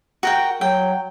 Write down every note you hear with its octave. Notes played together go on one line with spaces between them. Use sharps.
F#4 A#4 G5
F#3 G5